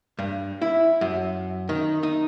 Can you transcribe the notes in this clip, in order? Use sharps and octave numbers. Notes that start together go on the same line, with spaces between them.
G2
E4
F#2
D#3
D#4